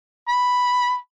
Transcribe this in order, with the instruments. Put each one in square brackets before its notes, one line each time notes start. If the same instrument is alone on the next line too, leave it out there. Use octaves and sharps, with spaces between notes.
[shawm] B5